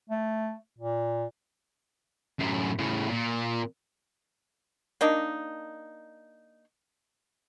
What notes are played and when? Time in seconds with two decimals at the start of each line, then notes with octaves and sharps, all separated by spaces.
0.10 A3
0.79 A#2
2.39 F#2 A2
2.79 A2 C#3
3.09 A#2
5.01 A#3 D4 D#4